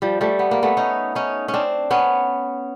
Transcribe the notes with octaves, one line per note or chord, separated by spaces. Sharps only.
F3 G3
G3 A3
B3
A#3
A3 B3
C#4 D#4
C#4 D#4
C#4
C4 D4
B3 C#4